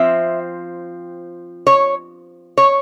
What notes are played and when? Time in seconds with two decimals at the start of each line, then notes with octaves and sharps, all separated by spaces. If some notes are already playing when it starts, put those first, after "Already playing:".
Already playing: F3 C4 E5
1.67 C#5
2.58 C#5